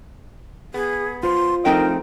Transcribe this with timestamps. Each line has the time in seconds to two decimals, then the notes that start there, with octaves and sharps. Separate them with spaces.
0.74 B3 G#4
1.23 F4 C5 C6
1.65 F3 A3 C4 D#4 A#4 G5